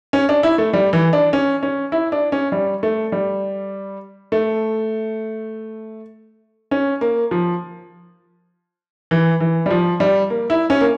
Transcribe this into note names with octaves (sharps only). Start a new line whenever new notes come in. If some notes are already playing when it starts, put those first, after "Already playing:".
C#4
D4
E4
A3
G3
E3
D4
C#4
C#4
E4
D4
C#4
G3
A3
G3
A3
C#4
A#3
F3
E3
E3
G3
F3
G3
A#3
E4
C#4
A#3